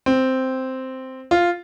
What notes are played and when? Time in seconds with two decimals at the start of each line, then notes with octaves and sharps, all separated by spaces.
0.06 C4
1.31 F4